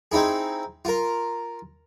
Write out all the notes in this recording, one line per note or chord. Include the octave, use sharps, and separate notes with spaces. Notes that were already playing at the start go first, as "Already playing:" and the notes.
C4 D#4 E4 G#4
F4 A#4